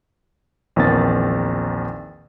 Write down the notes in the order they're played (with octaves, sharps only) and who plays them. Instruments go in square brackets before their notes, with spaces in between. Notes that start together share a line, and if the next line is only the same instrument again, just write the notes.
[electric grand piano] A#1 E2 D#3 C4 A6